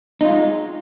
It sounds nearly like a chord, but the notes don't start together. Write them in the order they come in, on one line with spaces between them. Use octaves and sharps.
D#4 F4 G#3